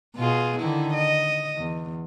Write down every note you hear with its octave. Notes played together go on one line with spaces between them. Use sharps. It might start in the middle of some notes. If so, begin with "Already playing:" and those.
B2 F4 G#4
D3 D#3 E4
D#5
E2